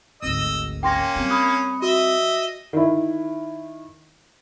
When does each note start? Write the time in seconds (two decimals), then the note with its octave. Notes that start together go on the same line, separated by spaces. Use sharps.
0.22 G#1 D2 D#5 E6
0.83 A#3 C#4 G5 C6 A#6
1.16 G3 C4
1.30 B5 D#6 F#6
1.82 F#4 D#5 E5
2.73 D#3 E4